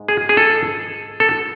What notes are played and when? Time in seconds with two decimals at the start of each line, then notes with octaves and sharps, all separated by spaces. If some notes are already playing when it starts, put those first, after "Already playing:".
Already playing: G#2 G#3
0.08 G#4
0.29 G#4
0.37 A4
1.20 A4